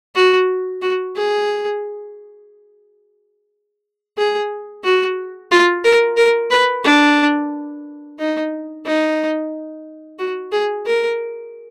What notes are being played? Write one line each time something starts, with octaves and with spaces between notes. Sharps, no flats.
F#4
F#4
G#4
G#4
F#4
F4
A#4
A#4
B4
D4
D#4
D#4
F#4
G#4
A#4